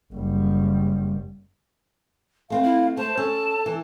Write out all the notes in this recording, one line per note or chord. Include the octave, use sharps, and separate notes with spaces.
F#1 G3
A3 C4 B4 F5
E4
A3 C5 A5
C#4 A4
E3